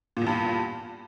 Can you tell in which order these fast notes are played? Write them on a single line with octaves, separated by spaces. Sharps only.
A#2 E2 G2